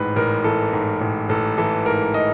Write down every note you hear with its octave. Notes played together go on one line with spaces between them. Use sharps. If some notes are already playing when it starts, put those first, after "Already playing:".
Already playing: A1 G#2 B4
A1 A#4
E3 A4
G#2
A1
A1 A4
E3 A4
G#2 A#4
D#5